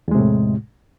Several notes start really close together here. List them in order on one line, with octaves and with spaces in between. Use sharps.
E2 G#3 C3 A2